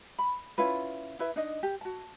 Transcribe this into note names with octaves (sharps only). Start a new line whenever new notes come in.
B5
C#4 E4 F4 B4
E4 B4 E5
D4 D#4 D#5
G4
F#4 A5